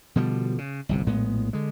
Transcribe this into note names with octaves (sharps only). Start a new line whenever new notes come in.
B2 D3 F3 G3
C#3
G1 C2 C3
A#1 A2 G#3 B3
D3 G#3